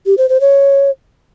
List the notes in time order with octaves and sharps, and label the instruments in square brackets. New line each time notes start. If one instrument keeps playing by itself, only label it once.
[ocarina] G4
C5
C5
C#5